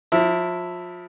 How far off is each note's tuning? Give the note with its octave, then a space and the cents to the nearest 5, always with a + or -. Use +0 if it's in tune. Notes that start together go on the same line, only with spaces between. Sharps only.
F3 +30 E4 +0